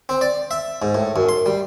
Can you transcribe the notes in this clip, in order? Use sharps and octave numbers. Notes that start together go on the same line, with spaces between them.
C4
D5
E5
G#2
A2
F#2
C6
G3